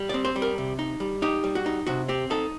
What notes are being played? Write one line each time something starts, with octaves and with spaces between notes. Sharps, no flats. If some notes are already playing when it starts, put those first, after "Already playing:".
Already playing: G3
C4 D5
C5
G3
A#4
C3
D#4
G3
D#4 G4
G3
F#4
D#4
C3 F#4
C4 G4
D#4 A4